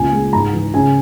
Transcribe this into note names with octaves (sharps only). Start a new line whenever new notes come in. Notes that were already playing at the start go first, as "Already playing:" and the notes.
Already playing: C#2 A#2 G#5
G#3
G#2 A#5
E3
C#3 G#5